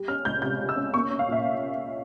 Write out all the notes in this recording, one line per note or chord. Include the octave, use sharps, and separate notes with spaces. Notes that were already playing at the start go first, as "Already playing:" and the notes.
Already playing: G3
C#4 F6
C#2 G6
C3 G6
G3
E6
C#4
A#3 C#6
C#4
F5
A#2 E5